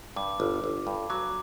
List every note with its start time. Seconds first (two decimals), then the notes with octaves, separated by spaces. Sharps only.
0.16 G2 D6
0.40 G1
0.64 G1
0.87 G2
1.10 F#3 D6